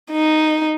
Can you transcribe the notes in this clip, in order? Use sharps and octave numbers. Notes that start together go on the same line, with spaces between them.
D#4